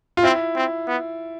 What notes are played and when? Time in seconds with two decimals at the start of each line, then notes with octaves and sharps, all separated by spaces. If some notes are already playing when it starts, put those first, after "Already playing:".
0.17 F4
0.23 C4 E4
0.56 C4
0.87 B3